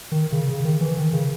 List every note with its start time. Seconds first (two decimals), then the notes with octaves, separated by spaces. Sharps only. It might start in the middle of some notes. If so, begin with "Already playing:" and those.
0.12 D#3
0.32 C#3
0.49 C#3
0.65 D#3
0.81 E3
0.97 D#3
1.13 C#3